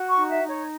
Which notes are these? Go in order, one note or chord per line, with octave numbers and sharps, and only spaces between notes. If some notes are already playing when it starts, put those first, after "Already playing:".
Already playing: F#4
C#6
D#4
E5
D#4
C#5